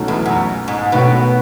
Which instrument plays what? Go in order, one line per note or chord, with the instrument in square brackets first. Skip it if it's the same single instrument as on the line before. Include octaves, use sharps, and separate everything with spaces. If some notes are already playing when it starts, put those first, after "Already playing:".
Already playing: [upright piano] C#2 B2 F#3 A3 D#4
[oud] E2
F#2
G#2
[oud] B2 [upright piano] D#3 A3 C#4 F#4 B4